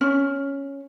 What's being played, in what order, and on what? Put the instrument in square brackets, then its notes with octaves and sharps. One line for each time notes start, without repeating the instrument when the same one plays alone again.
[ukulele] C#4